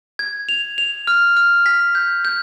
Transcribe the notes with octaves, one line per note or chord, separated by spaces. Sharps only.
G#6
F7
F7
F6
F6
B6
G6
G6